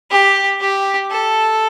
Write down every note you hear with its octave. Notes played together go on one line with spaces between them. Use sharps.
G4
G4
A4